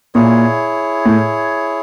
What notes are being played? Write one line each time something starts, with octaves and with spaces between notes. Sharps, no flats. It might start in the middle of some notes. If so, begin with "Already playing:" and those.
A#2 E4 G#4 C#5
A2